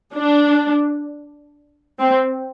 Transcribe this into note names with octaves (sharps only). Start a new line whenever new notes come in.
D4
C4